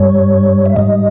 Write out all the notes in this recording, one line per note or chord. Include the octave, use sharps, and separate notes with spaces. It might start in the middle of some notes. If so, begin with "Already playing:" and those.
Already playing: G2 G3 C#5
E5
G#2 G3 D#5